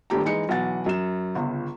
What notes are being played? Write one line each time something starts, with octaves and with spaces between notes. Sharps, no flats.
D#1 G2 A3 G4 A#5
E3 G#3 D#4 C#7
B1 E3 F#5 A6
F#2 E7
G1 C#2